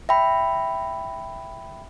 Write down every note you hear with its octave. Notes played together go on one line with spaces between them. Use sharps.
E5 G5 B5